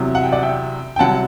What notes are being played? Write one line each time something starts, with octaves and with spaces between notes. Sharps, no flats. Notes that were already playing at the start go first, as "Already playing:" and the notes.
Already playing: E2 C3 F#3
F#5
G5
D5 F#5
E5 G5
G5
C2 C3 F#3 F#5 A5